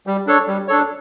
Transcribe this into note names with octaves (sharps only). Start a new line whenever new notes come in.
G3
D4 A4 C#5
G3
D4 A4 C#5